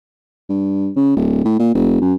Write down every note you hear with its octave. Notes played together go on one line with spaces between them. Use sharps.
G2
C#3
D1
A2
A#2
F1
F#2